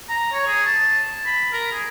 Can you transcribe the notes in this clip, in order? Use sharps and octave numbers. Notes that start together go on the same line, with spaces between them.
A#5
C#5
G#4
A5
B5
A#4
G#4